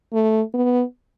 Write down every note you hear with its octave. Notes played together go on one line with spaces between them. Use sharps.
A3
B3